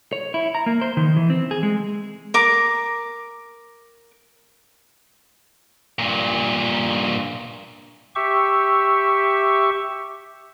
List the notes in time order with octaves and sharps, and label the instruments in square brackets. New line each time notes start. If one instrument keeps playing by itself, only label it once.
[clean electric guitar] C#5
E4
A#5
A#3
C5
D#3
E3
C4
G#4
G#3
[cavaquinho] A#4 D6
[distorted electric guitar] G2 A#2
[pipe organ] G4 E5 C#6